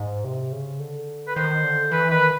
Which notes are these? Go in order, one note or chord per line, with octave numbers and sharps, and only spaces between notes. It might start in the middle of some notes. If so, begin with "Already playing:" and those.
Already playing: G#2
C3
C#3
D3
B4
D#3 C5
D3
E3 B4
D#3 B4